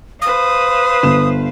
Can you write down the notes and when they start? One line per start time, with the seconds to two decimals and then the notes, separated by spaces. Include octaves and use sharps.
0.22 B4 C5 F5 D#6
1.03 G1 E7